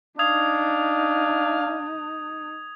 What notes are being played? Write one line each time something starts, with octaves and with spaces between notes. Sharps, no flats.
D4 D#4 F5 D#6 G#6 F7